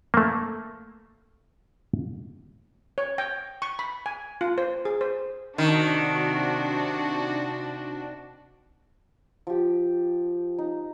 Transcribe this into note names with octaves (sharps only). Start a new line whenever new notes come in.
A3 A#3
C#5
G5
C#6
B5
G#5
F4
C5
G#4
C5
C3 D#3 D4 F#4
F3 G4
D#4